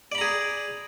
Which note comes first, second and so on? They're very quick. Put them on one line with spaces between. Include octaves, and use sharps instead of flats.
D5 B5 A#5 G#4